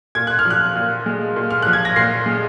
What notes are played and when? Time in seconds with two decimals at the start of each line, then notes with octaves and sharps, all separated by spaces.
0.15 A#2 G#6
0.27 F#6
0.39 F6
0.46 F3 F#6
0.75 A#2
1.06 G#3
1.36 A#2
1.51 F6
1.62 F3 F#6
1.73 G#6
1.85 A#6
1.96 A#2 C7
2.26 G#3